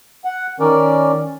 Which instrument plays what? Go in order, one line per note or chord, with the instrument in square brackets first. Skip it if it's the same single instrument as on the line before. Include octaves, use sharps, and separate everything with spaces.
[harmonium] F#5
D#3 C#4 A#4 D5